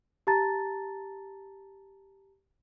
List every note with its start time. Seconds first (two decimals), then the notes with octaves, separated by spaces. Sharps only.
0.27 G4 A5 A#5 A6